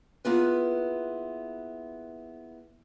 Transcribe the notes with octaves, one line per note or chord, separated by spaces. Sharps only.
A#3 B3 E4 F4 G#4 B4